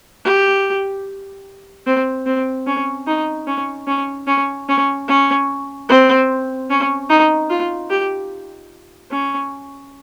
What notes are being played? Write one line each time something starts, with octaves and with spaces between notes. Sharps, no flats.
G4
C4
C4
C#4
D#4
C#4
C#4
C#4
C#4
C#4
C4
C#4
D#4
F4
G4
C#4